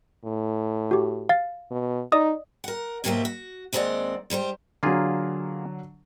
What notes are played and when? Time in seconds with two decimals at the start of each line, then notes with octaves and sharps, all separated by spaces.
0.24 A2
0.91 F#4 G4
1.29 F5 A6
1.71 B2
2.12 D#4 D5 D#5 D#6
2.64 A#4 F#5
3.04 G#2 B2 F#3 A#3 G4 E5
3.25 F#4
3.73 D#2 G#3 C4 C5 D5 F#5
4.30 G#2 G3 B4 C5
4.83 D3 F#3 A#3 F4 G#4